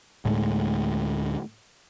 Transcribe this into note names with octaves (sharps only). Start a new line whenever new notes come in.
D2 A2 G#3